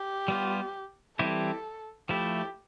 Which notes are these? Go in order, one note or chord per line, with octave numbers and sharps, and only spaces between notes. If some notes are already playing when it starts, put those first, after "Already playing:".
Already playing: G4
G3 B3 F4
E3 G3 C4 E4 G4 A4
F3 A3 E4 G4